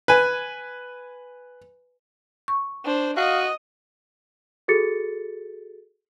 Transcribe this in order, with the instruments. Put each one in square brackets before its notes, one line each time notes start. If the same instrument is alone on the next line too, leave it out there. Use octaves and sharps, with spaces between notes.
[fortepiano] B4 G#5
[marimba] C#6
[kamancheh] D4 C5
[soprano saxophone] F#4 [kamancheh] D#5 D#6 [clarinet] F5
[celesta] F#4 G#4 A4 A6 C#7